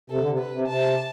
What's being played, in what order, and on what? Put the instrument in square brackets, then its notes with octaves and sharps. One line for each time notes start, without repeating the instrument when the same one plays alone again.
[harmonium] C3 [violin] A4
[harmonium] D3
C3
[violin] B4
[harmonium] C3
[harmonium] C3 [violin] A5